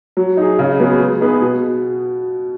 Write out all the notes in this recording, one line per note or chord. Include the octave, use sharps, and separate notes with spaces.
F#3
D#4 G#4
C#3
F#3 B3 G#4 B4
G#3
B3 D#4 G#4 B4
B2